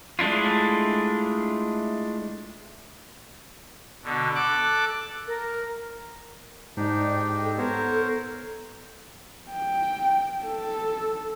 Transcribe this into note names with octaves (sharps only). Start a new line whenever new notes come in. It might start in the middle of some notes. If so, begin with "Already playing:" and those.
G#3 A3 D4 E4 F4
B2 D3
A4 D6 F#6
A#4
G#2 D4 D#4 G4 D5
G5
A4
B3 A#4 C5 C#5
G5
A4